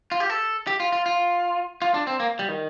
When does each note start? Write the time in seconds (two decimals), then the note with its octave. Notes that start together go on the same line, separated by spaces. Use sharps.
0.11 F4
0.20 G4
0.30 A4
0.67 G4
0.80 F4
0.92 F4
1.06 F4
1.82 F4
1.94 D4
2.07 C4
2.20 A#3
2.39 G3
2.49 D#3